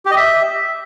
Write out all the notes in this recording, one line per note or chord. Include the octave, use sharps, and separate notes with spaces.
G4
D#5
E5